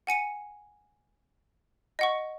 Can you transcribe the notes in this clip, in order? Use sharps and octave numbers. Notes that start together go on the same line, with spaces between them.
F#5 G#5 C#7 D#7
D#5 F#5 C#6